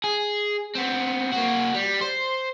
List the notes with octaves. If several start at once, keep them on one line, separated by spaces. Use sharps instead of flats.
G#4
B3 C4
A#3 F#4
G3
C5